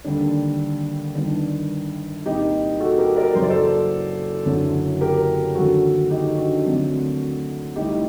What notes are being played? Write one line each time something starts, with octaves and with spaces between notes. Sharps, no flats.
D#2 D3 G3 D4
G1 G2 D#3 D4
C2 A#2 G3 D#4 G4
F#4 A4
G4 A#4
A#4 D5
F#1 F#2 F#3 C5
D5
A4 C5
F#1 F#2 D3 F#3
G4 A#4
D#2 D3 F#3 F#4 A4
D#4 G4
D4 F#4
D2 C3 F#3
A1 A2 G3 D#4 G4